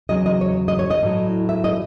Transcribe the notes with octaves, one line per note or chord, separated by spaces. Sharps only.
E2 C#3 F#3 D#5
D#5
C#5
D#5
C#5
D#5
A2 F#3
E5
D#5